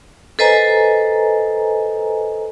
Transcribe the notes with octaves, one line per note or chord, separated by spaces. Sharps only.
A4 B4 C5 D#5 G#5 A#5